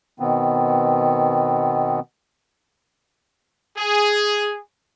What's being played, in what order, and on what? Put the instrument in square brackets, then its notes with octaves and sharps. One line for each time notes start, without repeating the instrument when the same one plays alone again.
[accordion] B2 D#3 B3 C4
[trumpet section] G#4